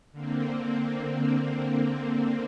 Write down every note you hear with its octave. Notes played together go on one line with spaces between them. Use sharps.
D3 A#3 C4